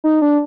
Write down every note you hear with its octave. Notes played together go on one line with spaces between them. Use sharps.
D#4
D4